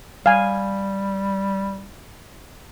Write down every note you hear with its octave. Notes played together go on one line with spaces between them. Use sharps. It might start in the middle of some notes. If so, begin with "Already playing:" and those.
G3 F5 G#5